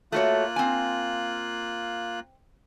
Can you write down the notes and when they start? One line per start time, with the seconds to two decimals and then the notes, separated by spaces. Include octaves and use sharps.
0.12 A3 A#3 F4 F#4 C#5 F#6
0.56 C4 G#5